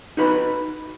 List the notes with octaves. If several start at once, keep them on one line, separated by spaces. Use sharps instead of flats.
D#4 F#4 B4 B5